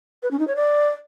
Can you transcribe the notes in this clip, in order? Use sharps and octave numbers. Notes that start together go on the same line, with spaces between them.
B4
C#4
D#4
C#5
D5